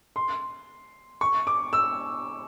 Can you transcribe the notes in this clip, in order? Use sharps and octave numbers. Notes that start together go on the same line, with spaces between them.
C6
C#6
D6
E6